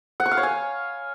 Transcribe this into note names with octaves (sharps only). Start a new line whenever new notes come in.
F#5
C#6
F5
C#5
G#5